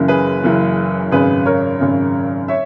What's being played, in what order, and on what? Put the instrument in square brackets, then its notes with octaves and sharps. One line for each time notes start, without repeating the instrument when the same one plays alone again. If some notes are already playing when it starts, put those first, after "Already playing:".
Already playing: [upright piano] F#1 F#2 C#3 E3 A#3
G#4 B4
F#1 F#2 C#3 E3 A#3
G#1 F#2 C#3 G#4 B4
A#4 C#5
G#1 F#2 C#3
C#5 E5